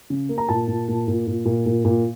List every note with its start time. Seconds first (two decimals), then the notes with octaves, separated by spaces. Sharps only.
0.10 C#3
0.29 A#3
0.38 A#5
0.49 A#2 A5
0.68 A#2
0.88 A#2
1.08 A#2
1.27 A#2
1.45 A#2
1.66 A#2
1.85 A#2